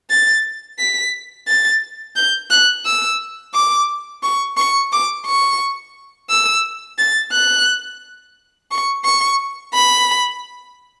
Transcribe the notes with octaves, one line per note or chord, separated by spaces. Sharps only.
A6
B6
A6
G6
F#6
E6
D6
C#6
C#6
D6
C#6
E6
A6
F#6
C#6
C#6
B5